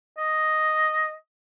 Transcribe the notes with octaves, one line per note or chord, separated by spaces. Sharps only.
D#5